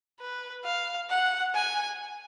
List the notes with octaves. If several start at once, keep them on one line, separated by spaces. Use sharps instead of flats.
B4
F5
F#5
G#5